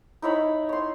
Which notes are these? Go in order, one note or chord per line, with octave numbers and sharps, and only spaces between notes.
D#4 E4 C#5 B5
C#5 C6